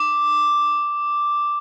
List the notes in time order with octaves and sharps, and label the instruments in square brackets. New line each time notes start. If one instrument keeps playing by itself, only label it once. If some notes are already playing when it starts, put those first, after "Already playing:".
Already playing: [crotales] D6